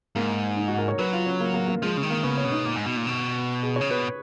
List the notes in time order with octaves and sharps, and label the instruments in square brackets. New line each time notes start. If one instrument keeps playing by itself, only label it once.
[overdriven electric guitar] G#2 [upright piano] A#3
[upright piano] D#4
F#4
A#4
C#5
[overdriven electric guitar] F#3 [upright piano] B4
[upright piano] F4
C#4
A#3
A#3
A#3
[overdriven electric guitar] F3 [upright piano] G#3
[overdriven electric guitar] C#3
D#3
[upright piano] A#3
[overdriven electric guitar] C#3 [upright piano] B3
[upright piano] C#4
[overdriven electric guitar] B2
[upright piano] D#4
[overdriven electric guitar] A#2
G#2
B2
A#2
B2
[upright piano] G#4
[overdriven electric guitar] C#3 [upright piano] C#5
[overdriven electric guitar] B2 [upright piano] B4